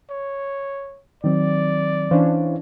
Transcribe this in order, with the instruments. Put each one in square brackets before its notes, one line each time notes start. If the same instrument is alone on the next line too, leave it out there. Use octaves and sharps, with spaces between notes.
[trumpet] C#5
[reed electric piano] D#3 F#3 C4 [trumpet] D5
[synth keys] E3 C#4 D4 [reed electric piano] C5 F5